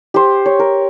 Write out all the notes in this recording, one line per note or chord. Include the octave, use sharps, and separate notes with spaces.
G4 C5
C#5
A#4